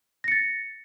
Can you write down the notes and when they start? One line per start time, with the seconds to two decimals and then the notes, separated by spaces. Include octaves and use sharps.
0.24 A#6
0.28 C#7
0.32 A6